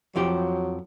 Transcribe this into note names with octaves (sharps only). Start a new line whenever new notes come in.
F2 F3 F#3 G4